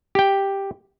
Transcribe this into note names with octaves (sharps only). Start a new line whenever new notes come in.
G4 G5